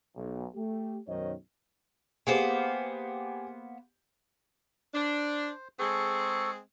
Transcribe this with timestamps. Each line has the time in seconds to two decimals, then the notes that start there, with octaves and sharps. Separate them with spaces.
0.16 B1
0.55 A3 G4
1.08 B1 F#2 D#3 C5 C#5 D#5
2.27 A#3 B3 G4 G#4 C5
4.94 D4 C5
5.79 G#3 C4 G#4 A4 C#6